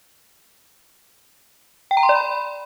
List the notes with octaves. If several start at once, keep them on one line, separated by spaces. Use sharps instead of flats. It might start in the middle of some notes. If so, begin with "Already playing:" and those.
G5
A#5
C6
D5
B5